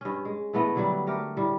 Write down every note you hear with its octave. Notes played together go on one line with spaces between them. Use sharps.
G2 C#4
G#3
E3 A3 B3 D#5
D3 F#3 G3
A3 G4 A#4
A2 G3